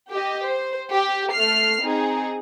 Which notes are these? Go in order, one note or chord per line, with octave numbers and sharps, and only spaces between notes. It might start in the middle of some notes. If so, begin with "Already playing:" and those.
G4 D#5
C5
G4
A3 F6 C7
C4 D#4 G#4